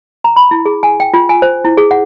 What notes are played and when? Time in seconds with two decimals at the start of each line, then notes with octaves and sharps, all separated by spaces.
0.24 A#5
0.36 B5
0.51 E4
0.66 G#4
0.83 G#5
1.00 G5
1.14 F4
1.29 G#5
1.42 C5
1.65 E4
1.77 G#4
1.91 F#5